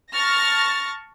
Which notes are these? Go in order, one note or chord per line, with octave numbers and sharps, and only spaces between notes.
A5 C#6 F6 A6 A#6